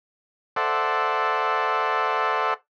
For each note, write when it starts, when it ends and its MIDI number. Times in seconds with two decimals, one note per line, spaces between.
0.56 2.54 69
0.56 2.54 72
0.56 2.54 74
0.56 2.54 76
0.56 2.54 78